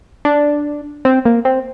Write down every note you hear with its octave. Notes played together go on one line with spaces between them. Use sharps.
D4
C4
A#3
C4